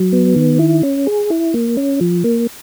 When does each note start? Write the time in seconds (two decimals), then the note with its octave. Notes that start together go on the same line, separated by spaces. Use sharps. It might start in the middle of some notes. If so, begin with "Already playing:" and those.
Already playing: F#3
0.12 B3
0.36 D#3
0.59 E4
0.83 C#4
1.07 G#4
1.30 E4
1.54 A#3
1.77 C#4
2.01 F3
2.24 A#3